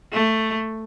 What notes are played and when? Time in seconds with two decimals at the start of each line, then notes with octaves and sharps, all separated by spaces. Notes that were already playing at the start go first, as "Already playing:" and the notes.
0.12 A3